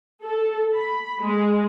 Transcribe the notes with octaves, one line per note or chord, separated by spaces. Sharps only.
A4
B5
G#3